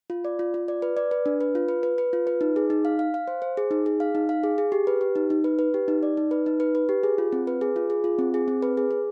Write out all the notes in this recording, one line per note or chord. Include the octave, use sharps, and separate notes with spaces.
F4
D5
F4
F4
D5
B4
D5
B4
D4
B4
F4
B4
B4
B4
F4
B4
D#4
G#4
D#4
F5
F5
F5
C5
C5
G#4
D#4
G#4
F5
D#4
F5
G#4
G#4
G4
B4
G4
D#4
D#4
B4
B4
G4
D#4
D5
D#4
B4
D#4
B4
B4
G4
G#4
F4
C4
B4
G#4
F4
G#4
F4
C4
G#4
C4
B4
G#4
G#4